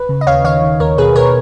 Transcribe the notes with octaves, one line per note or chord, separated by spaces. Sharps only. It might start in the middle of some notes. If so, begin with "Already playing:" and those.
Already playing: B4
C#3
D#5
D#2 C#5 F5
D#3 C#5 F5
D#3
D#2 A#4 C#5
B2 G#4 B4
B2 A#4 C#5